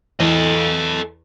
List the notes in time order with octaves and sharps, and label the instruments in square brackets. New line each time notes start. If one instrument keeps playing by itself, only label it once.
[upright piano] E2 [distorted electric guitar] A4 D#5